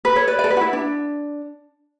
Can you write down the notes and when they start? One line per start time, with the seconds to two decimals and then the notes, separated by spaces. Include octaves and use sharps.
0.05 B4
0.16 A4 C#5
0.27 B4 D5
0.39 B4 D5
0.44 A4
0.50 B4
0.57 F#4
0.61 E4
0.73 D4